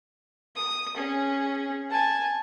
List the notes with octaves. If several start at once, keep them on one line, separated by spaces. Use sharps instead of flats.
D#6
C#4 G#4
G#5 A5